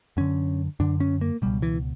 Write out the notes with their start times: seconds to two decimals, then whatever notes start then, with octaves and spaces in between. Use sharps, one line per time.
0.17 F#2 D3 C#4
0.80 F#2 D3 D4
1.00 C#4
1.21 A#3
1.42 C#2 B2 G3
1.62 E3